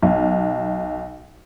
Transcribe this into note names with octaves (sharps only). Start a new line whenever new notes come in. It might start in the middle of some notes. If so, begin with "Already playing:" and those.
B1